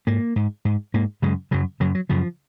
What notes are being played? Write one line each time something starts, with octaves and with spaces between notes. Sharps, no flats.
G#2 A#3
G#2
G#2
G#2 A#3
F#2 C#3 G#3
F#2 C#3 F#3
F#2 C#3 F#3
F#3
F#2 C#3 F3